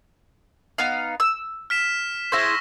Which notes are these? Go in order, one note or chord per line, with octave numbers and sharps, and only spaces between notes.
B3 D#4 F5
E6
F6 B6 E7
E4 G#4 C5 C#6 E6 A#6